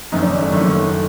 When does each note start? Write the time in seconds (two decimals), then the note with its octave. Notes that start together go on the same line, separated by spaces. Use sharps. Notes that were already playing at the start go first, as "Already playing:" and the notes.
0.12 F#1 F#2 D#3 D#4
0.22 D4
0.31 C#4
0.42 A3
0.52 F#1 F#2 D#3 A3